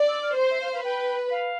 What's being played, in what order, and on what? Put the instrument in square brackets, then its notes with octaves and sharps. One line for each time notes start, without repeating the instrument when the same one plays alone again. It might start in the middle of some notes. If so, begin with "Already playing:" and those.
Already playing: [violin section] D5
[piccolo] E6
F6
[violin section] C5 [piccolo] C6
[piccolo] E5
F5
F5
[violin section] B4 [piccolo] G5
[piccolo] F5